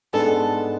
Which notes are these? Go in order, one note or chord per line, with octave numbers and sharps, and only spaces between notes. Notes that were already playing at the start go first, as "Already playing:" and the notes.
G#2 G#3 B3 D4 A4